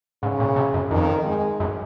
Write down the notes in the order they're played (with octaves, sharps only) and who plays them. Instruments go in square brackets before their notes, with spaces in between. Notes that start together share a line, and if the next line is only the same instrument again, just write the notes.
[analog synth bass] G#2 [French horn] C#3
[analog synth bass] A#2
C3
F#2
[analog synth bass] F2 [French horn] D#3
[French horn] G#3
[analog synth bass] F#2